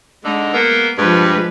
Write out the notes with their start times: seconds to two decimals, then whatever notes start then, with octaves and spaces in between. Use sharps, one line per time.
0.25 D3 G#3 D#4
0.54 A#3 B3
0.98 G2 F3 G#3 B4